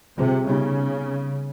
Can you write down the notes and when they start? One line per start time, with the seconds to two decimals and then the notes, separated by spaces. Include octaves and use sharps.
0.17 C3 G3 C4 F4 G#4
0.46 C#3 G3 B3 D#4 G4